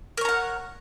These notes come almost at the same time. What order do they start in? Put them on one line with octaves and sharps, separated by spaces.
A#4 C#5 A#5 F#5